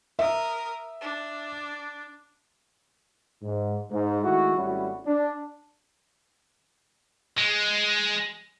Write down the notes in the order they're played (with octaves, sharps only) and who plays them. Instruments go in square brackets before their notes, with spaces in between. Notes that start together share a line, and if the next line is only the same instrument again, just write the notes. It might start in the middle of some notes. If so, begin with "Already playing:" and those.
[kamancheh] A#4 D#6 [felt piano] E5
[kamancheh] D4
[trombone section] G#2
G#2
D#3 G#3 A3 E4 F#4
G#1 G3 A3 C#4 E4 F#4
D4
[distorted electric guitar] G#3